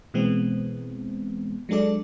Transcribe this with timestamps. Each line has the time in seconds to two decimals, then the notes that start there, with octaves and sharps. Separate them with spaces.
0.14 B2 E3 G#3 B3 C4
1.69 F#3 G#3 D4 A4 D5